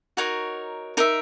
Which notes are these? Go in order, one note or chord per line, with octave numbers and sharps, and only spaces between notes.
D#4 F#4 A#4 C#5
D#4 A#4 E5